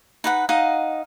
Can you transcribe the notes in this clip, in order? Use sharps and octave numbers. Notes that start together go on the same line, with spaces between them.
D#4 B4 F#5
D#4 D#5 F5 F#5